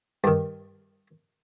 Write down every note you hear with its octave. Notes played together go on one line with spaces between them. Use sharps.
G2 D#3